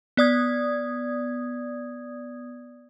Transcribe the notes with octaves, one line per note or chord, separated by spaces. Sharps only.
B3 D5 D#6 G#6